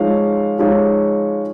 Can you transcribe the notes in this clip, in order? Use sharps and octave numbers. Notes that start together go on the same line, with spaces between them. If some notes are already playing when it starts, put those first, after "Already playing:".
Already playing: F3 G#3 D#4 C#5 F5
F3 G#3 D#4 C#5 F5